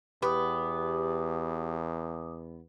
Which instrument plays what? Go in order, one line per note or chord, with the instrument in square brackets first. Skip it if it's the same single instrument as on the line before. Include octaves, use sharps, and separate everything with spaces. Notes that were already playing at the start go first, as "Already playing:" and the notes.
[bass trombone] E2 [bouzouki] B3 [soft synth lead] G4 [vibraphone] D6 D#6